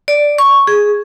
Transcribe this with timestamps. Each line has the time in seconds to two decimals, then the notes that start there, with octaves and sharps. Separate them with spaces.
0.08 D5
0.38 C#6
0.67 G#4